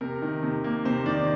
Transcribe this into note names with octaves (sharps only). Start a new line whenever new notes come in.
C3 A#4
D#3
C3
A#3
C3 C5
D#3 D5